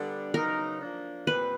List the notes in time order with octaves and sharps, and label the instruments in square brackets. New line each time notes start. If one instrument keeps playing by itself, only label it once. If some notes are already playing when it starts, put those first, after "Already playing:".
Already playing: [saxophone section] D3 G3 B3 D4
[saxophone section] C#3 F#3 B3 D#4 [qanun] A#4
[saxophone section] F3 A#3 D4
[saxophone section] A#2 G3 C4 [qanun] B4